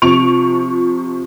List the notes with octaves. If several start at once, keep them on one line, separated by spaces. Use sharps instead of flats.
C3 F3 C#6 D7 F7